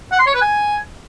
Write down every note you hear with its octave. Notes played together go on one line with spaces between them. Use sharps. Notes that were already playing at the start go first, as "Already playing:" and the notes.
F#5
C6
C#5
B4
G#5